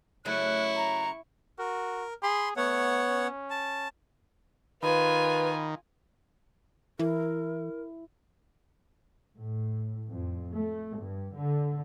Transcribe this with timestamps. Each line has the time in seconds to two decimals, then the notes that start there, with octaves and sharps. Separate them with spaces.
0.25 C#3 F#3 A3 E4 C#6 F#6
0.76 A#5
1.59 F#4 A#4
2.23 G#4 B5 C6
2.57 A3 B3 C#5 F#5
3.08 C#4
3.50 A5
4.83 D#3 F4 B4 G#5 B5
6.99 E3 E4 A#4
9.38 A2
10.10 F2
10.55 A3
10.96 G2
11.34 D3